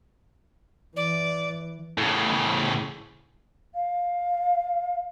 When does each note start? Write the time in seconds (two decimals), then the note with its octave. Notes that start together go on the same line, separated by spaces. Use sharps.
0.96 E3 D5
1.98 A2 C#3
3.75 F5